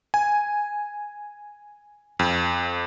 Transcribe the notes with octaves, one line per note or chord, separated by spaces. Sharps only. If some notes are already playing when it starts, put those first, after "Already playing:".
G#5
F2